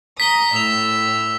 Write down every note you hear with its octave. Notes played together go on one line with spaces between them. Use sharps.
A#5 D#6 B6 G7
A2 E6 F7